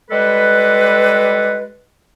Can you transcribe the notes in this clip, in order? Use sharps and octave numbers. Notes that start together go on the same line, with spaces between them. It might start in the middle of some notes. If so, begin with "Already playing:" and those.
G3 G#3 A4 B4